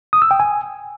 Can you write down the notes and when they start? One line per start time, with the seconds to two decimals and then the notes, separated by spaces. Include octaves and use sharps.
0.13 D#6
0.22 E6
0.31 G5
0.40 G#5